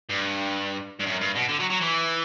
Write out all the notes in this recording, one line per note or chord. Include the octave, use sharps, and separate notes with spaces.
G2
G2
F#2
G2
B2
D3
F#3
F#3
E3